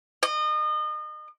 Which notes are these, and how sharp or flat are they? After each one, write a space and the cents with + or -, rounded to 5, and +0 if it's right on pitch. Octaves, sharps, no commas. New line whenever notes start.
D#5 -35